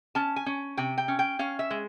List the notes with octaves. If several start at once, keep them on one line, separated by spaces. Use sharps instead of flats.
C#4 A5
G#5
C#4
C3 G5
G5
C#4
G5
C#4 F5
E5
G#3